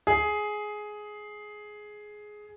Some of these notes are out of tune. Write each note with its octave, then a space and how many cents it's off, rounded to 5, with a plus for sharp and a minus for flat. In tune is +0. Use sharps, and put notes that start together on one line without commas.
G#4 +10